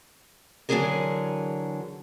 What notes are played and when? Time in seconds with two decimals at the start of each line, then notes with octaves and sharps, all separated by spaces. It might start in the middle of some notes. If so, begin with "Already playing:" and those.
0.69 D3 E3 F#3 C#4 G#4 A#4